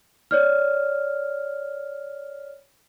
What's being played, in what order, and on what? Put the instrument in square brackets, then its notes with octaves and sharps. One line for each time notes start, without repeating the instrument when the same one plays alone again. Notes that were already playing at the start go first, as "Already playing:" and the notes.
[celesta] C#5 D5 F6